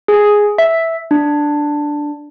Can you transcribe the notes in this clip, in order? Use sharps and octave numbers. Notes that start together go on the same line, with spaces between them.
G#4
E5
D4